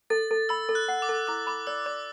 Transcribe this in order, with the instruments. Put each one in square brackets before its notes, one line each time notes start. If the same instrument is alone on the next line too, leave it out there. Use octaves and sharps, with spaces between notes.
[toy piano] A4 [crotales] A6
[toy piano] A4
[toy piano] B5 [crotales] E6
[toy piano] A4
[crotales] F#6
[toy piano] F#5
[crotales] D6
[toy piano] A4
[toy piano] E4 [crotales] D6
[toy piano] B5 [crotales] D6
[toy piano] D5 [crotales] E6
[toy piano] D5 [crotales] D6